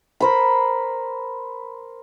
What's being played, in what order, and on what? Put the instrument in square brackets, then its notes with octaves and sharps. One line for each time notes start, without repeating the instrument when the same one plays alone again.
[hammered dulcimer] A#4 C5 B5